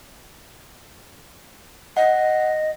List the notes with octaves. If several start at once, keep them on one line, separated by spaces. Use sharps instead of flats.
D#5 F#5